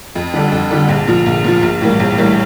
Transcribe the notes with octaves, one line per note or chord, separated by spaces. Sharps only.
F2
D3 G3 D4 A4
F2
D3 G3 D4 A4
A#1
A#2 F3
A#1
A#2 F3
A#1
A2 E3 G3 A#3
A#1
A2 E3 G3 A#3